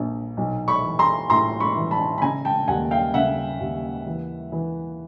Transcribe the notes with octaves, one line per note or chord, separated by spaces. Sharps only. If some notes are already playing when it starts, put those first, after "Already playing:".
Already playing: A#1
B1
B5 C#6
E3
A#5 C6
A2 A#5 C6
B5 C#6
E3
A5 B5
B5
C#3 G#5 A#5
G5 A5
D#2 F#5 G#5
F5 G5
C#3 E5 F#5
D#2
E3
E3